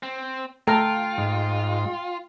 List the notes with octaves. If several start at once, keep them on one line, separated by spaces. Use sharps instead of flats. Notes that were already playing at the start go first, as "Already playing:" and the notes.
C4
A3 F4 A4 G5 A#5 F6
G#2